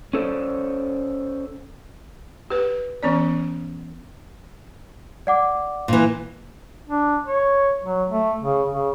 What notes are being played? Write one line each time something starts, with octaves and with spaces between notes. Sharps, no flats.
C#4 A4 C5 D5
G4 B4
E3 B3 C#4 D5
D5 F#5 D6
A#2 E3
D4
C#5
F#3
A3
C#3
C#3